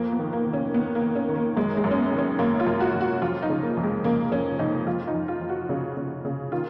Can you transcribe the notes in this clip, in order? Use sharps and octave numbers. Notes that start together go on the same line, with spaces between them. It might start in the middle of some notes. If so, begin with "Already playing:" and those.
Already playing: F2 A#3
B3
D#3
A#3
D#3
C#4
D#3 B3
A#3
D#3
C#4
D#3
A#3
F#2 G#3
G#3
F#2
C#4
B3
D#3
C#4
F#2 A#3
F4
F#2
F#4
F#2
F#4
F2 F4
D#4
C#3
A#3
F2
G#3
C#3 A#3
F2 C#4
F2 D#4
F2 F4
D#4
F2
F4
F2
F#4
C#3
C#3
C#3
D#3 F4